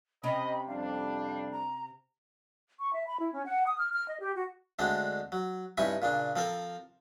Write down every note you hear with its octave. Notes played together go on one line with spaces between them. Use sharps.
C3 C#4 D#5 B5
F2 G3 D4 F5
A#5
C#6
E5
B5
E4
C#4
F#5
D#6
F6
F6
D#5
G4
F#4
D2 D3 G#3 C4 D4
F#3
G2 C3 C#4 D#4 E4 C#6
A#2 C#3 D4
F3 C4 A4 A#4